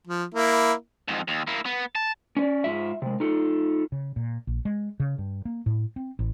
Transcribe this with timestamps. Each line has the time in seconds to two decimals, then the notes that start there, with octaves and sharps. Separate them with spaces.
0.07 F3
0.34 A#3 E4
1.08 F2 G#2
1.28 D#2
1.47 A#3 E4
1.66 B3
1.95 A5
2.37 C#4 C#5 D5
2.64 G#2 F4 E5
3.02 C3 G#3
3.20 D#4 F4 A4
3.92 C#3
4.16 A#2
4.47 A#1
4.65 G#3
5.00 C#3
5.18 G2
5.45 A#3
5.66 A2
5.96 C4
6.19 A1